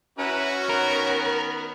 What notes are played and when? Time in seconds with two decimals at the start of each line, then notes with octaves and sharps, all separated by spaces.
0.18 C#4 E4 F#4 B4 A#5
0.69 D#3 B3 A#4 B5